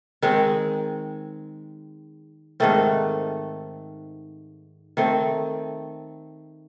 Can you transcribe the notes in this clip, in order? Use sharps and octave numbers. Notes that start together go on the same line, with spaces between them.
D#3 G#3 C4
G#2 D#3 A3 C4
D#3 A3 C4